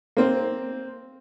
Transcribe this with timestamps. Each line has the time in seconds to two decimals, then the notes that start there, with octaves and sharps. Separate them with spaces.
0.17 A#3 C4 C5